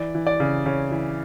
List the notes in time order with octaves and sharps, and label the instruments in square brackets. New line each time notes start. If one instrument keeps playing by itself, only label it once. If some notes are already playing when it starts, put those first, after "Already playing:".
Already playing: [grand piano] E3 D5
E3
D5
C#3
C#3 C#5
E3